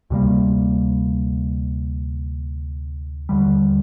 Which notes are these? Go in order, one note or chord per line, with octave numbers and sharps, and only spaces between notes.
D2 C3 G3 A#3
D#2 D3 G3